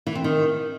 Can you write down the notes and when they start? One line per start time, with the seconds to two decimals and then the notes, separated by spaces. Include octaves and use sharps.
0.07 E3
0.15 C4
0.24 D#3